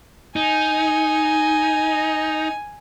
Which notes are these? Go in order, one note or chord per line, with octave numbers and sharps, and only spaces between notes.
D#4 G#5